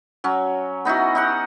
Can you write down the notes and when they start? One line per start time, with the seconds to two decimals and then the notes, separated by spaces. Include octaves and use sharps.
0.24 F#3 C#4
0.85 B3 D#4 E4 F#4
1.15 D#4 G4 F#5